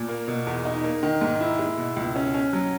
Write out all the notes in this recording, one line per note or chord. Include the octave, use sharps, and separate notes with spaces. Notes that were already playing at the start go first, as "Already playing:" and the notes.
Already playing: A#2
A#3
B2
E2
D#4
A#3
D#3
G#2
E4
G#3
B2
C#2
C#4
C#4
F#3